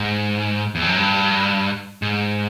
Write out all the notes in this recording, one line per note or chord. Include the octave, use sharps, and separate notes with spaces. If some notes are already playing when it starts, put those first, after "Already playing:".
Already playing: G#2
E2
F2
F#2
G2
G#2